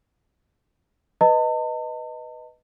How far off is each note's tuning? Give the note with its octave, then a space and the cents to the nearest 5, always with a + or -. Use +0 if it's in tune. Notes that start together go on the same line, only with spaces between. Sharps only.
B4 +0 D#5 +0 A5 +45